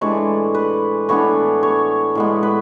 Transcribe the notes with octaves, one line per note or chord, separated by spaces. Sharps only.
A2 E3 G#3 D4 C#5
B4
A2 E3 B3 D4 C#5
C#5
A2 G#3 B3
B4